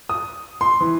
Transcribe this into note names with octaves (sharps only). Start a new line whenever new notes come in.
D#6
C6
E3